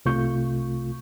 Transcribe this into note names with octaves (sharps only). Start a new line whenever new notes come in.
C2 C3 A3 F4 C#6 G6